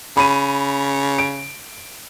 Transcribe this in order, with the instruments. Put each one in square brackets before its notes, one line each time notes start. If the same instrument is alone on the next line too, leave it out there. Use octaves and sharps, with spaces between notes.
[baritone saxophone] C#3 [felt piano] B5 D#7
[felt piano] D7